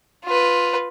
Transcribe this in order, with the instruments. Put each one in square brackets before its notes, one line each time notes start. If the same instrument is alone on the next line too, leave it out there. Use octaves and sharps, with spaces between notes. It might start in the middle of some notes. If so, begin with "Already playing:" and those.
[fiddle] F4 B4